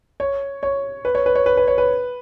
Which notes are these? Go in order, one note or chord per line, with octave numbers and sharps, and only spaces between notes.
C#5
C#5
B4
C#5
B4
C#5
B4
B4
C#5
B4